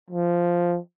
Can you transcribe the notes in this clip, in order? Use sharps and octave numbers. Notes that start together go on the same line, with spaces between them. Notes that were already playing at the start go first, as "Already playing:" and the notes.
F3